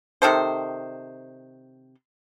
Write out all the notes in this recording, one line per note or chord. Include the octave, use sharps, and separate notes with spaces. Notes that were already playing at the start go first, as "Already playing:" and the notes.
C3 D#3 A4 C5